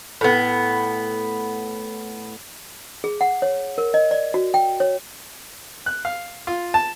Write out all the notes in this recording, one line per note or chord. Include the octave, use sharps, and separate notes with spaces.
A2 B3
G#4
F#5
C#5
A#4
D#5
D5
F#4
G5
C#5
F#6
F5
F4
A5